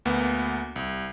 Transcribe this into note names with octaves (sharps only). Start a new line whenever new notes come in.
D2 A#3 B3
C2